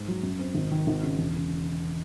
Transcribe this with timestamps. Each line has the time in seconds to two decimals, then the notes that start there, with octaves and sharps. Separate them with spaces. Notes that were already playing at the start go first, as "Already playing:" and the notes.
Already playing: G#2
0.08 F#3
0.23 F#2
0.39 C4
0.55 G#1
0.71 D#3
0.87 G#1
1.03 C#3
1.18 E1
1.34 C#3